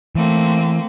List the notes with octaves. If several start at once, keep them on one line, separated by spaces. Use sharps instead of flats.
E3 A3 A#3 C4